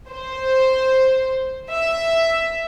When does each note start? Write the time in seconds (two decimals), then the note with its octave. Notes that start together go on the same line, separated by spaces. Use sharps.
0.11 C5
1.70 E5